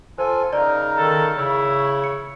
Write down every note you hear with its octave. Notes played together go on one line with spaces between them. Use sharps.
F4 A4 C5 G#5
C#3 D#4 A#4 D5
D#3 A4
C#3 E4 C#5
C#7